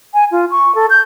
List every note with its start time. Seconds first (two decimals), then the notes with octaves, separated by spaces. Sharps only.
0.14 G#5
0.32 F4
0.51 C#6
0.75 A4
0.90 G6